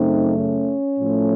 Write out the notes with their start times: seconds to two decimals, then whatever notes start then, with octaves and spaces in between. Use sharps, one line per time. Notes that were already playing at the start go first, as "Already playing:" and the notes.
Already playing: F#2 C#3 A3 C4 D#4
0.39 C#4
0.99 A2 F3 A3